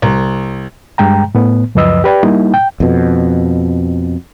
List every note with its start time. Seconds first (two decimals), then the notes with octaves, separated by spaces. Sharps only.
0.02 C2
0.98 G2 G#3 G5 A#5
1.35 A2 B3
1.75 C#2 F#2 F3 B4 D#5 E6
2.04 G4 B4 D5 G5
2.23 G3 A#3 D#4 E4
2.54 G5
2.80 F2 B2